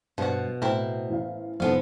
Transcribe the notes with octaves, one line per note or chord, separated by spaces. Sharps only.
G2 B2 F3 F#5
A2 C4 E4 A#4
A1 F5
F1 F2 G#2 F3 B3 A4 F5